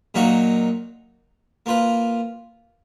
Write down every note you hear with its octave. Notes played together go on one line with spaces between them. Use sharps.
A#2 F#3 A#3 D#4 F#4
A#3 F4 B4